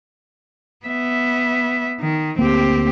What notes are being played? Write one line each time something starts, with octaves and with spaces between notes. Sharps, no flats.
B3 E5
D#3
D2 A#3 C4 G4